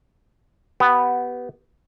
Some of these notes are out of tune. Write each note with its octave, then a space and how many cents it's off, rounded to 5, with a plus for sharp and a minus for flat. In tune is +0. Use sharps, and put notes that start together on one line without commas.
B3 +0 G4 -20